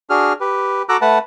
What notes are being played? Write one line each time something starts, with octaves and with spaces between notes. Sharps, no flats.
D4 F#4 G#4 F6
G4 B4
F#4 A4 A#5 D6 E6 F#6
A3 B4 F#5 A5